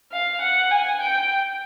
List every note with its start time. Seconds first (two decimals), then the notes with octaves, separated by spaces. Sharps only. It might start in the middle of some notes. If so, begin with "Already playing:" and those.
0.12 F5
0.41 F#5
0.71 G#5
1.01 G5